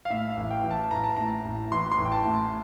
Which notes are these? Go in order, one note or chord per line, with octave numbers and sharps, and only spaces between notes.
F5
A2 E5
F5
A1
G5
E3
A5
A1 A#5
A5
A2 A#5
A1
E3 C6
C6
A1
G5
A5
A2